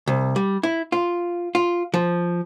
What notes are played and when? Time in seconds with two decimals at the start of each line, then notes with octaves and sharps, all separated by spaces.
0.07 C2
0.36 G3
0.63 E4
0.92 F4
1.55 F4
1.94 F3